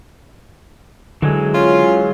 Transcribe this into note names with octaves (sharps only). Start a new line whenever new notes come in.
D3 E3 F#3 G#3
C#4 F4